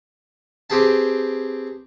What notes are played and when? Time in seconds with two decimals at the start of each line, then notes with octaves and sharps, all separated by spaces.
0.70 C4 G4 G#4 B4 A5